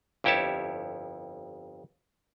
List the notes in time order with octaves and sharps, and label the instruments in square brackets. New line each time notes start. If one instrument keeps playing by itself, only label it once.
[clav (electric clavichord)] G1 F2 E4 G4 C#5 A5